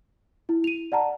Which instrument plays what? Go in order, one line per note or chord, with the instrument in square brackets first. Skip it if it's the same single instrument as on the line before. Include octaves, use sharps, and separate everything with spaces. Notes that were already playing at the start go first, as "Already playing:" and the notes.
[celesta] E4
D#7 F7
D5 F#5 A5 A#5